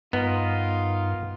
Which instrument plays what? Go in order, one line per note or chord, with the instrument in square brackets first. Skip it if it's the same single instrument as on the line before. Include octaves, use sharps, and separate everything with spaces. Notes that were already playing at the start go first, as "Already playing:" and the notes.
[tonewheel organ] G2 [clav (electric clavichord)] B3 [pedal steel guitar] D#4 A#4 D#5 [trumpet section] F4